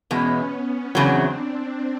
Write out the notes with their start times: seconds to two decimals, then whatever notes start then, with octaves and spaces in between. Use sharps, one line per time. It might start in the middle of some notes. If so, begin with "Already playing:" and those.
0.10 E2 B2 G#3 B3 C#4
0.52 B3 C#4
0.95 E2 C#3 F#3 C4 D4